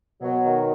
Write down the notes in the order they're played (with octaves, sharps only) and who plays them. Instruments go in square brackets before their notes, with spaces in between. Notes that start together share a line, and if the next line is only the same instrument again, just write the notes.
[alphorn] B2 [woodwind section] F#3
[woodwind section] D#3